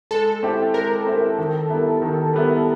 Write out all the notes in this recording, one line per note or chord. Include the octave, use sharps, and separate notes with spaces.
G#3 A4
C4 E4 G4
G#3 A#4
C4 E4 G4
D#3
G3 B3 E4
D#3
G3 B3 E4